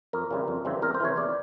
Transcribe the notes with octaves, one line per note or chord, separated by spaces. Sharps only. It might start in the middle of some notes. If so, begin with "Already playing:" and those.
F2 A#4
C#3 E3 G3 C4
F2
C#3 E3 G3 C4
E2 A#4
C5
C3 E3 C#5
E2 D5